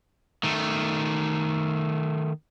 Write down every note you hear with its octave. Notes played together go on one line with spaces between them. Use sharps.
D#3 A3